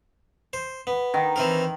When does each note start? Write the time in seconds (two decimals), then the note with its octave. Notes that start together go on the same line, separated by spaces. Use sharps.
0.53 C5
0.87 B3
1.14 D#3
1.36 E3 C4 A#4